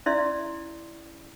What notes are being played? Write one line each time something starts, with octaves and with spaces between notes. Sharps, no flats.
C#4 E4 D5 E5 C6